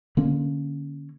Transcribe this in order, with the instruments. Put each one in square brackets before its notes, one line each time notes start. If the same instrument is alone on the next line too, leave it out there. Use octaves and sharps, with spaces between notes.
[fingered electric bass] D3 A#3 C#4